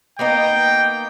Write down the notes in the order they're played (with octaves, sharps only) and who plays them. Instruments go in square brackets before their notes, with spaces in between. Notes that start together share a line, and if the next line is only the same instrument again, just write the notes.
[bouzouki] A#3 B3 D#4 [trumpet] G5